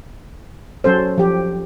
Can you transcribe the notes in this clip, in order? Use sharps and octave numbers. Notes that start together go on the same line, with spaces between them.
F#3 C#4 A4 C5
F3 G4